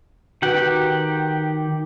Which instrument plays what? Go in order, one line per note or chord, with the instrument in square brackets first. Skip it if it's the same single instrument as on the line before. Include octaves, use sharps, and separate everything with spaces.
[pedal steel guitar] D#3 G4 F#5 [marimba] F#4 B4